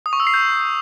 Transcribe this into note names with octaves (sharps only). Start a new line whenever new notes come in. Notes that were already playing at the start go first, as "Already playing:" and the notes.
D#6
C#6
E6
C7
G6